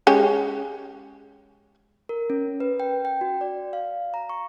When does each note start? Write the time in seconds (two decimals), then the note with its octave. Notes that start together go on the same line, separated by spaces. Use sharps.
0.07 G#3 C#4 G4
2.09 A#4
2.30 C#4
2.60 B4
2.80 G5
3.05 G5
3.21 F#4
3.41 D5
3.73 F5
4.14 A#5
4.29 C#6